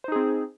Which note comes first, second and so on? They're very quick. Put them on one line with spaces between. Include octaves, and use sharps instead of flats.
C5 D#4 G#4 C4